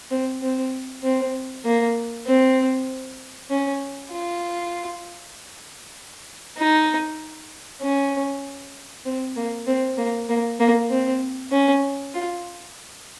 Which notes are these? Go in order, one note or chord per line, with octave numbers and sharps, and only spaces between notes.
C4
C4
C4
A#3
C4
C#4
F4
D#4
C#4
C4
A#3
C4
A#3
A#3
A#3
C4
C#4
F4